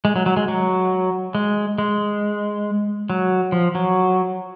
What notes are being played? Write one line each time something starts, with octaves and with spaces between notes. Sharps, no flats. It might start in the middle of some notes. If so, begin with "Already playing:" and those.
G#3
F#3
F#3
G#3
F#3
G#3
G#3
F#3
F3
F#3